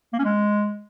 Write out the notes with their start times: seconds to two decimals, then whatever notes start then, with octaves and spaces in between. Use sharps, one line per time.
0.13 A#3
0.19 C#4
0.24 G#3